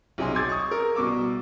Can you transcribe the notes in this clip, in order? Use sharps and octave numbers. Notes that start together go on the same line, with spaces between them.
B1 C3 D#4 G#4 C6
C6 D6 E6 G#6 A6
C#6 D#6
A#4
C2 B2 C#6 D6 E6